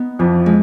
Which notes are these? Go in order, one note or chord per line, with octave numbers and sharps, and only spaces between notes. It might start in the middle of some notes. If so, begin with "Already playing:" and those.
Already playing: B3 D#4
F2 E3 F3
G#3